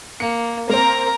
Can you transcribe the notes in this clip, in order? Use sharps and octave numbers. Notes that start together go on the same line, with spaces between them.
A#3 C#7
A#3 C4 A#4 A#5